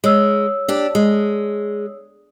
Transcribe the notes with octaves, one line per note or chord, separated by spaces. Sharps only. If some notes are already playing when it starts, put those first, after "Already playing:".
G#3 C#5 E6
D4 G4
G#3